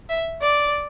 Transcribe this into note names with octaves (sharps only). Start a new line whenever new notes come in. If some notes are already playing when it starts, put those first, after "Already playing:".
E5
D5